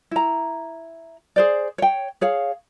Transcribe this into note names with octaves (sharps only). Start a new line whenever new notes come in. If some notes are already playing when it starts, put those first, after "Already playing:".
E4 A#5
G#4 C5 D5
C#5 G5
G#4 C#5 F5